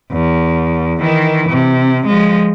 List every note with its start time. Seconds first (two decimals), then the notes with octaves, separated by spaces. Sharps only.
0.12 E2
1.00 D#3 E3
1.50 C3
2.07 F3 G#3